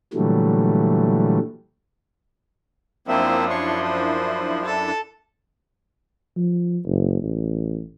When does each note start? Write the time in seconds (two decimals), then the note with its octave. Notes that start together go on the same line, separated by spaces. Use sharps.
0.14 A#2 D3 E3 F#3 G3 A3
3.08 F#2 F3 A#3 C4 D4 E4 E5
3.50 C#5 C6 C#6
3.83 C5
4.65 A4
6.36 F3
6.85 F#1
7.21 A1